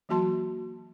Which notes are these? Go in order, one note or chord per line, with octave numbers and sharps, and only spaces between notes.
E3 F#3 A#3 F#4 A5 C6